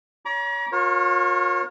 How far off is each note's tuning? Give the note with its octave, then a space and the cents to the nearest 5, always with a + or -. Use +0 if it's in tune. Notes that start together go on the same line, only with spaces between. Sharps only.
C#5 +25 A#5 +40 D6 -25
F4 +40 A#4 +10 C#5 -25